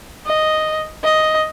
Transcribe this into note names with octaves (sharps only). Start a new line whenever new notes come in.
D#5
D#5